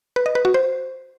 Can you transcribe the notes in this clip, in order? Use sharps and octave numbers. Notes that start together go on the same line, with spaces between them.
B4
D#5
B4
F#4
C5